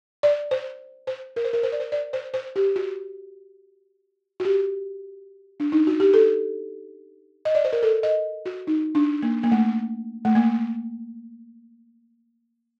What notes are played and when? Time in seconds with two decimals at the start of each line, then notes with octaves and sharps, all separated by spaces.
0.23 D5
0.51 C5
1.07 C5
1.36 A#4
1.45 C5
1.53 A#4
1.63 C5
1.72 D5
1.80 C5
1.92 D5
2.13 C5
2.34 C5
2.56 G4
2.76 F#4
4.40 F#4
4.45 G4
5.60 D4
5.72 D#4
5.87 F#4
6.00 G4
6.14 A4
7.45 D#5
7.55 D5
7.65 C5
7.73 A#4
7.83 A4
8.03 D#5
8.46 F#4
8.67 D#4
8.95 D4
9.23 A#3
9.43 A#3
9.52 A3
10.25 A3
10.35 A#3